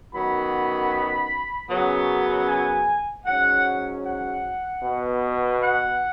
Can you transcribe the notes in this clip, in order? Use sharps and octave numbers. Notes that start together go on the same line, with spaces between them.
F#2 D#3 F#3 B3 B5
F#2 C#3 F#3 B3
G#5
G#2 F#3 C#4 F#5
F#5
B2 B3
F#5